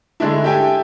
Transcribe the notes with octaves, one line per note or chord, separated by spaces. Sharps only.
D3 G#3 A3 D4 E4
G4 A4 E5 G5 G#5